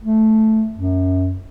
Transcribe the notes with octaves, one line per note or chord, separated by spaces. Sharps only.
A3
F#2